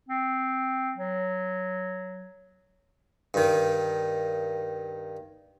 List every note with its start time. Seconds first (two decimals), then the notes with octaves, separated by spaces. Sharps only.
0.09 C4
0.97 F#3
3.34 G2 D#3